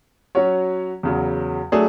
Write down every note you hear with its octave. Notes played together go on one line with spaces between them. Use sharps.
F#3 C#4 F#4 C#5
E2 C#3 F#3
F#3 A3 D4 G#4